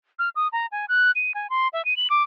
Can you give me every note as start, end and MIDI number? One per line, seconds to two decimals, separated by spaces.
0.19 0.29 89
0.36 0.48 87
0.52 0.66 82
0.72 0.85 80
0.89 1.11 90
1.15 1.32 99
1.35 1.50 80
1.50 1.68 84
1.73 1.85 76
1.85 1.96 99
1.97 2.08 102
2.10 2.23 86